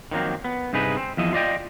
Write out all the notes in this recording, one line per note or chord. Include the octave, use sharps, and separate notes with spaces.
D#3 F3 F#3 A#3 C4
B3
G2 C3 D#4 G#4 B4
C4
E2 F3 E4 D#5
F4 D5 D#5 G5